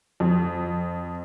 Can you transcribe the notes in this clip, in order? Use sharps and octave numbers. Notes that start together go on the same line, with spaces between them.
F2